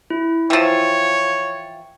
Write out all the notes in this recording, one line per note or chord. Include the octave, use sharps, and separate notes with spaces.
E4
E3 F3 C#5 G5 A6